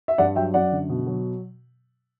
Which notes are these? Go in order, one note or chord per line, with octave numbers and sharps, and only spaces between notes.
E5
G2 D5 F#5
F#3 E5 G5
F#2 D5 F#5
D3
B2
F#3